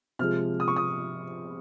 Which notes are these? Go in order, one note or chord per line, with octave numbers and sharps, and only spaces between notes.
C3 F3 G#3 F6
D#6
C#6
D#6